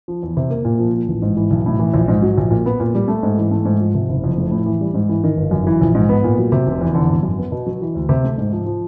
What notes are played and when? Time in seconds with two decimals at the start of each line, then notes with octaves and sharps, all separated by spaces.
0.08 F3
0.23 E2
0.37 C3
0.50 A#3
0.65 A#2
0.79 F3
0.94 F3
1.08 A1
1.22 G#2
1.37 E3
1.50 B1
1.66 A2
1.79 E3
1.94 A#1
2.08 G#2
2.22 F#3
2.37 A#1
2.51 A#2
2.66 B3
2.80 A#2
2.95 G3
3.08 A3
3.23 G#2
3.38 E3
3.51 A3
3.65 G#2
3.80 F3
3.94 C3
4.09 F#1
4.24 F2
4.38 A3
4.51 A2
4.66 E3
4.81 G3
4.94 G#2
5.09 E3
5.24 D#3
5.37 G1
5.51 F#2
5.67 E3
5.81 A#1
5.95 G#2
6.09 B3
6.24 A#2
6.38 F#3
6.52 C3
6.67 F1
6.81 E2
6.95 D3
7.10 G#1
7.23 F#2
7.38 B3
7.52 B2
7.66 F#3
7.82 E3
7.95 D2
8.09 C3
8.24 A3
8.38 G#2
8.53 F3
8.66 F3